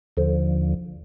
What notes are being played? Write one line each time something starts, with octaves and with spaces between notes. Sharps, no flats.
D#2 D3 F3